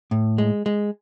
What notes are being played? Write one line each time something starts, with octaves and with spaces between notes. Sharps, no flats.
A2
G#3
G#3